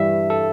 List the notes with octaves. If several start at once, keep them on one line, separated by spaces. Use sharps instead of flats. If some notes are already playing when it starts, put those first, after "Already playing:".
Already playing: G2 E3 G3 E5
A4